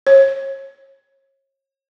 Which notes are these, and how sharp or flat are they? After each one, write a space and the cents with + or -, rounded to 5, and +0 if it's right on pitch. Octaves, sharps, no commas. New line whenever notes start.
C#5 -35